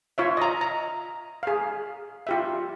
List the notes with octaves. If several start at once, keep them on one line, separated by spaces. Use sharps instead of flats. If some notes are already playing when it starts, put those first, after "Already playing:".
F4 C#5 E5
D#5 A#5
A#5
G#4 F5
F4 G4 E5